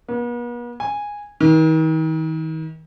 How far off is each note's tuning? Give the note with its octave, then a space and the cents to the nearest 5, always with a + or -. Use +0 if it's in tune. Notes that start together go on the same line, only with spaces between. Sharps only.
B3 -45
G#5 -10
D#3 +40